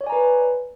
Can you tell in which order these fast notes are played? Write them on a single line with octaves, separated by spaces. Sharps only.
C#5 D5 G#5 A#5 B4